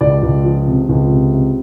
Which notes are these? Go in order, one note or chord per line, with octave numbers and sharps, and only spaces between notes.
C#2 D5
C#2
F3
C3
C#2
C3
C3